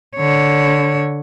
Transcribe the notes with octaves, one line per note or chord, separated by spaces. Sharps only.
D3 C#5